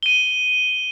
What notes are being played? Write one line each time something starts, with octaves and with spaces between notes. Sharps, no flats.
D#7 G7